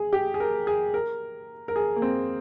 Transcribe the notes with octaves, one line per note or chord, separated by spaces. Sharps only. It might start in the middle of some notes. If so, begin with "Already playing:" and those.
Already playing: G#4
G4
G#4
A#4
G#4
A#4
A#4
G#4
A#3
C4